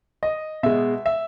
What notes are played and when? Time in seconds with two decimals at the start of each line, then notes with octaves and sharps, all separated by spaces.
0.23 D#5
0.63 B2 G#3 E5
1.06 E5